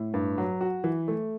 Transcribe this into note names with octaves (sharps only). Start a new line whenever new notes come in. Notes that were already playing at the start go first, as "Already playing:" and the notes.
Already playing: A2
G2
F#3
F#4
E3
A3